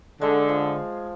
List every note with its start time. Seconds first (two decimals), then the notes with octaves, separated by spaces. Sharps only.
0.21 D3 G#3
0.49 F3